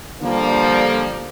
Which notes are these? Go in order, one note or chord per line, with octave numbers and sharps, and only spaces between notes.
D3 F3 G3 A#3